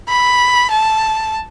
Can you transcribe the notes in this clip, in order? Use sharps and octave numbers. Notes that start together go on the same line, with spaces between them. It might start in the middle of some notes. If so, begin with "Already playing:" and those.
B5
A5